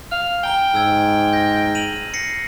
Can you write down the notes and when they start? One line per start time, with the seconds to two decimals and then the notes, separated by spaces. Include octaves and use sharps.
0.11 F5 F6
0.43 G5 G#5 A#5 G7
0.75 G#2 E6 G#6
1.33 G6 A#6
1.75 D#7 F7 F#7
2.14 A#6 C7 C#7